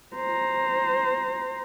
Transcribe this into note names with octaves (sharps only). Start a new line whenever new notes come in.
C5 A#5